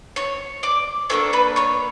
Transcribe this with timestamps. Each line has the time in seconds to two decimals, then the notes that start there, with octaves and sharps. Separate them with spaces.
0.16 C#5 C#6
0.63 D5 D6
1.10 A#3 D4 F#4 A4 C#5 C#6
1.33 B4 B5
1.56 C#5 C#6